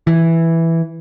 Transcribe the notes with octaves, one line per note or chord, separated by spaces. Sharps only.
E3